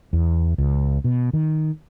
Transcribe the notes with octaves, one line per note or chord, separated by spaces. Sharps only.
E2
C#2
B2
D#3